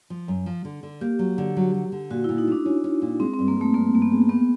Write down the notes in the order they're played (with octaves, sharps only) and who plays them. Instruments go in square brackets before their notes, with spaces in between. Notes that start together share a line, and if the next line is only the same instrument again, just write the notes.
[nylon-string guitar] F3
F#2
F3
D3
D3
[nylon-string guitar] A#3 [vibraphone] G4
[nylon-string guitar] F#3
D3
F#3
F#3
D3
[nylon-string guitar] A#2 [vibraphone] F#4
[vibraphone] E4
[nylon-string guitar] A#2
[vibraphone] D#4
[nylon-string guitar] A3 [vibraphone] D4
[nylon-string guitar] C#4
C#4
A#2
[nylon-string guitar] G#3 [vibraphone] C4
[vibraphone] C4
[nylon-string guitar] G2
[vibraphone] A#3
[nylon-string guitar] G#3 [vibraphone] A3
[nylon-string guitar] G2 [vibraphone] A#3
[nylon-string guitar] G2 [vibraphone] A#3
[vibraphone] B3
[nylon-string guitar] G#3
[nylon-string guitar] A#3 [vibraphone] B3